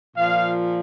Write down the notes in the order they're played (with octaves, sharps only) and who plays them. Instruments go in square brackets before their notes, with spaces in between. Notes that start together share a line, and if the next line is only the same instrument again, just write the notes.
[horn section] A#2 F3 F5